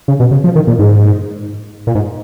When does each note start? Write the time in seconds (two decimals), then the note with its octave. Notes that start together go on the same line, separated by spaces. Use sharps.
0.08 C#3
0.20 B2
0.31 C#3
0.44 F3
0.56 D#3
0.67 A#2
0.79 G#2
1.87 A#2
1.95 G#2